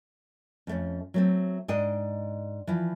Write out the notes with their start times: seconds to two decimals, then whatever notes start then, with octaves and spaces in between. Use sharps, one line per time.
0.67 F2 A3 C#4
1.14 F#3 A3 C4
1.68 G#2 D4 D#5 G5
2.67 E3 F3